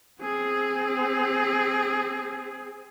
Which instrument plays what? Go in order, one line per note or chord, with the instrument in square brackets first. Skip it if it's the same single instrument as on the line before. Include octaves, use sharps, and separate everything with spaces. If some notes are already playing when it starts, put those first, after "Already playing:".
[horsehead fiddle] C4 G#4